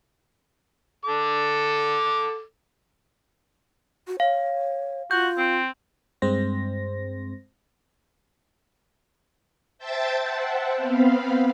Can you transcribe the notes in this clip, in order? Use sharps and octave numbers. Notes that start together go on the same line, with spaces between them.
A4 D6
F#4
C#5 F5
F4 F#4 G6
C4
G2 G#3 C4 C5 A#6
C5 E5 G5 A5 G6 A6
C5 E5 F#5 G5 A5
B3 C4 F5 B5